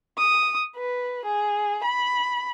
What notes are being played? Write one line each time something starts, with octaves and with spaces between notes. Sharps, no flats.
D#6
B4
G#4
B5